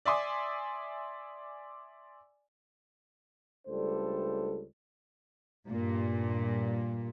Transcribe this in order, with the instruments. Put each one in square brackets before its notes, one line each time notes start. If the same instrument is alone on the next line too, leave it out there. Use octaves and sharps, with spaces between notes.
[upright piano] D5 E5 G#5 C6 D6 D#6
[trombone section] C#2 G3 A3 D4 A4 C5
[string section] G2 A#2